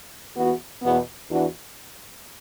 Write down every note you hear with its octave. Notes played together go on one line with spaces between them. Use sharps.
E2 E3 B3 F#4
E2 B2 B3
E2 E3 D4 F#4